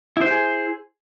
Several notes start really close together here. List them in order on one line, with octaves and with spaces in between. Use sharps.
E4 C5 G4 G#4